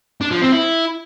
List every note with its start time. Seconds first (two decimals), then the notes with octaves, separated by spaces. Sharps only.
0.21 D4
0.31 F3
0.42 C4
0.53 E4